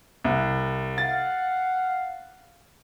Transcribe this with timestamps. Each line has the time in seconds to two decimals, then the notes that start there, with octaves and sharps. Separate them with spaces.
0.24 C2
0.98 F5 F#5 A6